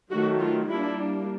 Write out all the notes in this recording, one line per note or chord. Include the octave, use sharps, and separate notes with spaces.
D#3 F#3 A3 F#4
F4
G3 A#3 D4 E4